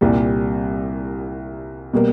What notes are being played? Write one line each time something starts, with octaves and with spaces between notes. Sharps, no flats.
C2 A#2 G3
B2 G3 A#3